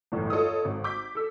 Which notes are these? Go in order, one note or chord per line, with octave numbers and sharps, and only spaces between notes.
G1 E2 A2
F4 A4 C#5 D#5 D#6
G#1
D6 G6 B6
A4 E6